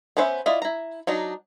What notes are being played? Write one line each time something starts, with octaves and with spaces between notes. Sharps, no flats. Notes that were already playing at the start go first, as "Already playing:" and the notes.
B3 C#4 B4 C5 E5
E4 F4 D5 D#5
E4 A#5
F#3 D4 D#4